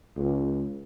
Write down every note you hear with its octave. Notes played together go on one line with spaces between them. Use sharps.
C#2